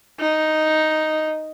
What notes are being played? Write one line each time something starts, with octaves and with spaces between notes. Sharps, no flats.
D#4